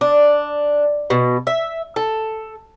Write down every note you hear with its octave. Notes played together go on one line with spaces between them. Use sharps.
D4
B2
E5
A4